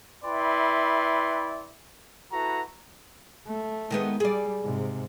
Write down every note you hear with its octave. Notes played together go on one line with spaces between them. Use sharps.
E4 B4 D5 E5 G5 C6
E4 F#4 A4 B4 F#5 A#5
A3
D#3 G#3 B3
G3 G#4 D5
G#2 C3